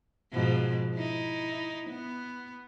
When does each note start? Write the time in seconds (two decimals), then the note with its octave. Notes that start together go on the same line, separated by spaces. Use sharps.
0.32 G#2 B2 F3
0.95 D#4 E4
1.90 B3